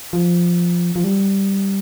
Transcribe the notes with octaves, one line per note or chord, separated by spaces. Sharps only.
F3
F3
G3